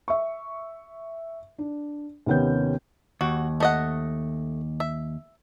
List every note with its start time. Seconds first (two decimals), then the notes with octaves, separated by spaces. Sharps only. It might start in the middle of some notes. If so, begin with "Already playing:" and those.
0.08 E5 C#6
1.58 D4
2.26 D#2 C3 B3 C#4 G6
3.21 D#2 F#4
3.60 A3 D#5 F#5
4.80 E5